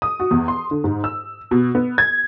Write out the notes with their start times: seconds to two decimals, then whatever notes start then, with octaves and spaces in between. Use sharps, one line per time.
0.02 D#6
0.20 F#4
0.31 E2
0.48 C6
0.71 D3
0.84 G#2
1.04 E6
1.51 B2
1.75 B3
1.98 G#6